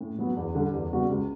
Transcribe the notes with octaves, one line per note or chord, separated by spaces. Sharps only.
A2
F#3 B3
E2
D3 G3
E2
C#3 G3 B3 F#4
C#2